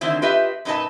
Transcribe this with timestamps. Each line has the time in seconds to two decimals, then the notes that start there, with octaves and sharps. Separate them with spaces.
0.01 D3 D#3 F#3 A3 C4 E4
0.22 F4 G4 B4 D#5 E5
0.65 F#2 A#2 D#4 B4 D#5 A5